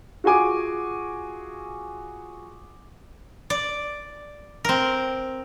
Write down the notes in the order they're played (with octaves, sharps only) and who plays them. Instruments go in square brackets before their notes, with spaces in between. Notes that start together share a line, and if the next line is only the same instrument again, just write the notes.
[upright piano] F4 F#4 G#4 G#5 D6
[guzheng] D5
C4 A#4